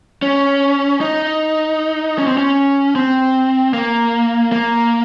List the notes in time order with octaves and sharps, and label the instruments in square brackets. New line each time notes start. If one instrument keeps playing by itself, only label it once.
[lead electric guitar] C#4
D#4
C#4
C4
C#4
C4
A#3
A#3